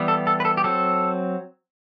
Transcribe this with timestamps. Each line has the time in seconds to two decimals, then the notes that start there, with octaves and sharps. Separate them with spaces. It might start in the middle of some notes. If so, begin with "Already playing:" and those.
Already playing: E3 G3 B3
0.08 A4
0.27 A4
0.40 B4
0.45 A4
0.57 G4
0.64 F#3 C4 A4